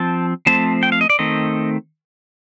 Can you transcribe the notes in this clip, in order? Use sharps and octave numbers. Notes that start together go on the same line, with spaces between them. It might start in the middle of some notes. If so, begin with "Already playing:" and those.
Already playing: F3 C4 A5
F3 A3 C4 A5
G5
F5
D#5
D5
D#3 A3 C4 D#5